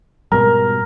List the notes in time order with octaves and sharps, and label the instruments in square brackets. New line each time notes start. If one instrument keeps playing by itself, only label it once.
[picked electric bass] G#2 B2 G3 [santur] A#4